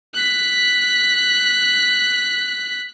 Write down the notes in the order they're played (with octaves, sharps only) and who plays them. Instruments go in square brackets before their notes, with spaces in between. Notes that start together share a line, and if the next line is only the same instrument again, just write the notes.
[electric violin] F#6 B6